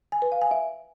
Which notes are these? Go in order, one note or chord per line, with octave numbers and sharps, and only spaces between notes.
G#5
B4
F5
G#5
E5